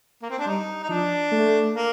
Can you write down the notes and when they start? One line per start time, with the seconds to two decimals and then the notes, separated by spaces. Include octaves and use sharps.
0.22 A#3
0.30 C4
0.39 D4
0.46 G3 D#4
0.83 D#4
0.89 F3 D4
1.32 A3
1.74 A#3